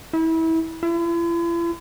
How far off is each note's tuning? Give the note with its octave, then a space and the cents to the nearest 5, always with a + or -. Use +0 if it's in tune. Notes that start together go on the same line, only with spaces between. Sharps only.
E4 -25
E4 +45